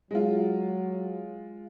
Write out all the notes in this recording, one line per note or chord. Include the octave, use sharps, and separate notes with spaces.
F#3 G#3 F4